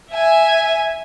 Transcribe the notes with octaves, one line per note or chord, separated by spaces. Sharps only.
E5 G#5